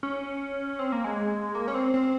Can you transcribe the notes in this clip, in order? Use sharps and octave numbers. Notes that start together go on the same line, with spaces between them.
C#4
C4
A#3
G#3
A#3
C#4
C4
C4